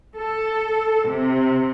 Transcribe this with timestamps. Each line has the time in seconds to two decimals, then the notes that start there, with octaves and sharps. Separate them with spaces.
0.17 A4
1.07 C3